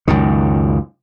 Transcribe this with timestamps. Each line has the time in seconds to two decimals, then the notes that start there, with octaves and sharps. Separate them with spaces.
0.08 C#2 F#2 D#3